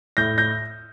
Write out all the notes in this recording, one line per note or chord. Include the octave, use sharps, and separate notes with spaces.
A2 G6 A#6
G6 A#6